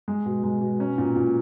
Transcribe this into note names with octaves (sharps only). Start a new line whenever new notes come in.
G#3
B2
G#3
B2
C#4
A#2
A#2